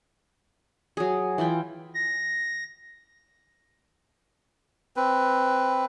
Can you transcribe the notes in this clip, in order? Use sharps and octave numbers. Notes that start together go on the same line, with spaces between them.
F#3 G#4
E3 E4 F4 G5
A#6
C4 B4